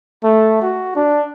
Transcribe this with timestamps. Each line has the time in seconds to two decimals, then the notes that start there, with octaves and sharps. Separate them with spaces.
0.24 A3
0.62 F#4
0.96 D4